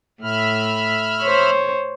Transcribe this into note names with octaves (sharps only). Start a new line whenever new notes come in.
A2 E5 B5 F6
C5 C#5